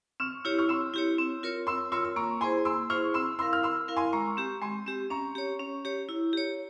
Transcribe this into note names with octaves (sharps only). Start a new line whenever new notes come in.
C4 C#6 F6
E4 G4 C#5 F6
C#6 F6
C4 C6 E6
E4 G4 C#5
C4
F4 A#4 C#5
C4 C6 E6
F4 A#4 C#5 C6 E6
E6
A#3 A#5 C#6
E4 G#4 C5 G#5 C6
A#3 C6 E6
E4 G#4 C5 C#6 F6
C4 C6 E6
E4 A#4 F5 C6 E6
F6
C4 C6 E6
E4 A#4 F5
G#5 C6
G#3 A#5 C#6
C4 G4
G#3 G#5 C6
C4 G4
C#4 A#5 C#6
G4 C#5
C#4
G4 C#5
E4
G4 C#5